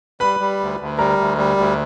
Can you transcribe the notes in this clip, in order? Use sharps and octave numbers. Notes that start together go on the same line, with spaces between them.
G3 B4 B5
G3
D2
D2
G3 A#4 A#5
D2
G3
D2